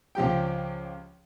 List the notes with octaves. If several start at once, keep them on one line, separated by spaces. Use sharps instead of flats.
C#2 F3 G4 G5